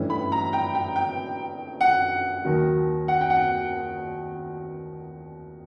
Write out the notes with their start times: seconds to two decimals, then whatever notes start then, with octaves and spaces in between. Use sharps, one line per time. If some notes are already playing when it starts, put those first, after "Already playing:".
Already playing: G2 E3 A3 C#4 E4
0.10 B5
0.32 A#5
0.53 G5
0.75 G5
0.96 G5
1.81 F#5
2.44 D#2 D#3 F#3
3.08 F#5
3.21 G5
3.30 F#5